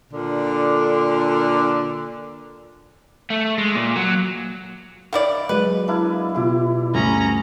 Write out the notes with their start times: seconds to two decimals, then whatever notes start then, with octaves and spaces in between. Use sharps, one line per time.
0.12 A#2 D3
3.30 A3
3.58 G#3
3.75 A#2
3.96 F#3
5.13 D#3 E4 C#5 D5 F5
5.49 F#3 G#3 B4 D#5
5.88 A#3 D4 E4
6.34 B2 E4 F4 G4
6.94 D2 G2 C#4 A#5 D#6